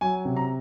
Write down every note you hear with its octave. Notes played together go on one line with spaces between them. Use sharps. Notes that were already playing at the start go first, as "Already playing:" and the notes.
F#3 G#5
C3
A#5